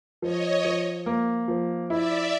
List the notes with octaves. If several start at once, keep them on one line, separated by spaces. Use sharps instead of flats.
F3 C#5 D#5
F3
A#3
F3
E4 D5 E5